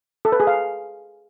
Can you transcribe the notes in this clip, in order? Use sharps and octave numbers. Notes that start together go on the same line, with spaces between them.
A4
B4
G#4
F5